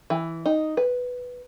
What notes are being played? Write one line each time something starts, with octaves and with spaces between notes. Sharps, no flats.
E3
D#4
B4